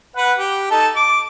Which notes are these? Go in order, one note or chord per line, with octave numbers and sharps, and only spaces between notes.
B4 F#5
G4
D#4 A4 A5
D6